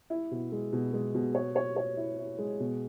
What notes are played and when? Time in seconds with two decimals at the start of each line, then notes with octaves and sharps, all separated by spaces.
0.10 E4
0.31 B2
0.52 G#3
0.73 B2
0.93 G#3
1.15 B2
1.35 C#5
1.56 C#5
1.77 C#5
1.97 E4
2.18 E4
2.39 G#3
2.60 B2